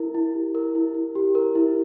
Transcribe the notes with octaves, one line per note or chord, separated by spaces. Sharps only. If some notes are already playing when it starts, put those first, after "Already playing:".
Already playing: E4 A#4
E4
G4
A#4
E4
E4
G4
A#4
E4